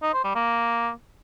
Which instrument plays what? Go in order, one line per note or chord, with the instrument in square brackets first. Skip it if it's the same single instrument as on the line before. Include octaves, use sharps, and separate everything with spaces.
[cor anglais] D#4
C5
G3
A#3